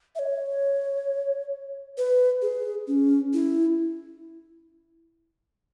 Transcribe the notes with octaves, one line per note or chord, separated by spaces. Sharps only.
E5
C#5
B4
G#4
C#4
E4